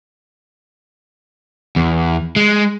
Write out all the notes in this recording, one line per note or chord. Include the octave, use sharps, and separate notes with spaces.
E2
G#3